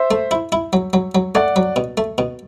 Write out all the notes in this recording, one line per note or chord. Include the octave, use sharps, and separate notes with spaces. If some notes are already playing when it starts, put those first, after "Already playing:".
Already playing: C5 E5
A3
E4
E4
F#3
F#3
F#3
A3 D5 F#5
F#3
B2
A3
B2